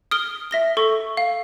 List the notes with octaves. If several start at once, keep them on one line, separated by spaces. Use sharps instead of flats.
D#6 F6 D7 G7
E5 A#6 G7
A4 C#6
F5